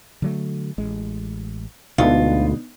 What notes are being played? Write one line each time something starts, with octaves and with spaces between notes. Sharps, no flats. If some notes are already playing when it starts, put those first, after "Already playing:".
D3 F#3 A3
A1 G#3
D2 B2 D3 G#3 B3 D4 D#4 F4